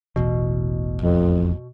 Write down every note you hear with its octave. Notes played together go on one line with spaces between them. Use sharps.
E1 A1 E2 B2
F2